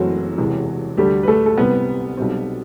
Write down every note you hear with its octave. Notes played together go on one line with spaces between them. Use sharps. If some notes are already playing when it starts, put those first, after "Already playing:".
Already playing: F#1 F#2 E3 F#3 A3 C4 F#4
E1 E2 C3 E3
D2 D3 G3 A3 D4 G4
B4
A3 A4
A4
C2 C3 G3 B3 C4 B4
B1 B2 G3 C4